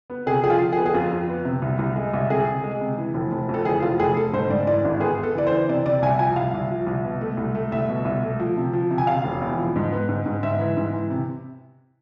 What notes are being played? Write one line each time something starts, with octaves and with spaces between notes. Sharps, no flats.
B3
C3 G#4
F3 G#4
F4
F3
G#4
B3
G#4
F2 F4
F2
B3
C3
C2
C2
G#3
C2
C3 G#4
C3
G#3
C3
E3
F1
F1
F2
A4
E3 G#4
F1 F4
F1 G#4
F1 A4
G#2 C5
G#2 D5
E3 D5
G#1
B3 G#4
B3
A4
E3 D5
C5
E3
C3 D5
C3 D5
C2 G#5
F3 G#5
C2 F5
C2
F3
C2
B2
A3
C2
A3
C2 E5
B2
C2
A3
F3
C3
F3
C3
G#5
C3 F5
E1
E2
F3
G#2
B3
G#2
G#2
G#2 E5
E3
G#2
E3
C3